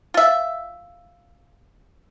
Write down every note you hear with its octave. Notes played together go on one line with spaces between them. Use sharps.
F4 E5